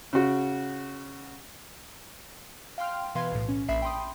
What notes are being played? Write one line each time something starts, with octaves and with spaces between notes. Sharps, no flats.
C#3 F#4
F5 G5 C6 F6
B2 E3 B4 F5 C6 G#6
B1 A2
C#4
A#1 E5 B5 C7
G5 B5 C6 D#6